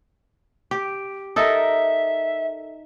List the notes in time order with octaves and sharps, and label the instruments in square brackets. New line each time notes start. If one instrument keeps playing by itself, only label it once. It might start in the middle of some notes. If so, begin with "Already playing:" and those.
[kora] G4
[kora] D#4 A4 A#4 [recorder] E5